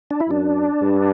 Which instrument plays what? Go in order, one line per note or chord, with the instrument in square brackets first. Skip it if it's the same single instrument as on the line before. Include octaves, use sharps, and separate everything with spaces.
[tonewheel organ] D4
E4
[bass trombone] F#2 [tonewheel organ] D4
[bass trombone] G2